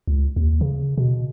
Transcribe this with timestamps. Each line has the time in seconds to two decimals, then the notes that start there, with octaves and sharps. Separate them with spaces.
0.07 C#2
0.36 D#2
0.61 C#3
0.98 B2